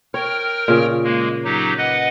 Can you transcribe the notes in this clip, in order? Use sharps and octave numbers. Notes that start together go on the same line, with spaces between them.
A#4 C#5 G5 F6
A#2 C#3
G#3 A#3
F#3 D#4 G4
B4 D#5 F#5